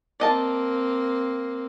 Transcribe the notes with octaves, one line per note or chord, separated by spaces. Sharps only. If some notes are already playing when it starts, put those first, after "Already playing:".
A#3 C4 D5 D#5 A5